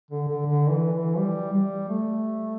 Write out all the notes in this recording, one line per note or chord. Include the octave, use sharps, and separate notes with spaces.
D3
D3
D3
E3
E3
G3
G3
A3